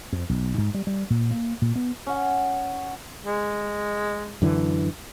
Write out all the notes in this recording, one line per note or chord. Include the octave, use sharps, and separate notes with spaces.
F2
B1
G#2
G3
G3
A#2
A#3
A#2
B3
C#4 F#5
G#3
F#2 D3 E3